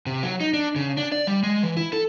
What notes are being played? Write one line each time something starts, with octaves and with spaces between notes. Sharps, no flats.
C3
F#3
D#4
D4
C#3
D4
D5
G3
G#3
E3
E4
A4